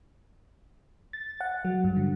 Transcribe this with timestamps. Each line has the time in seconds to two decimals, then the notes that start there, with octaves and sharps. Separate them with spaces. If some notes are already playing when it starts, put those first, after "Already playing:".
1.13 A6
1.41 F#5
1.65 F#3
1.84 G2
1.97 D3